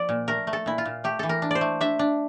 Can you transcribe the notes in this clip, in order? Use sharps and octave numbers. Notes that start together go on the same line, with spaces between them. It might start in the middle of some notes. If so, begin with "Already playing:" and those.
Already playing: F3 D5
A#2
A3 A#4
A3
A4
A#2 E4
F4
A#2
A3 G4
E3 A4
A#4
D4
C5 D5
A3
D4 E5
D4